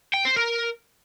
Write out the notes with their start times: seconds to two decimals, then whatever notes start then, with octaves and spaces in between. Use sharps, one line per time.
0.14 G5
0.25 C5
0.36 A#4